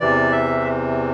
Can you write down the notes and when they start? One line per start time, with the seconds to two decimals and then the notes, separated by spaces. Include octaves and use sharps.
0.01 E2 C3 E3 D5
0.32 E5